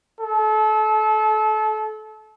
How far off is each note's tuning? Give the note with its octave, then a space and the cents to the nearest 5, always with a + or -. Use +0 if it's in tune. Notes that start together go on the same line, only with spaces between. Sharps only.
A4 -30